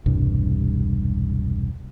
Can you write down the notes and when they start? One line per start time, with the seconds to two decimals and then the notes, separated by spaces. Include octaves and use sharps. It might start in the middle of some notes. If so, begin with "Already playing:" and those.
0.06 E1 C2 G2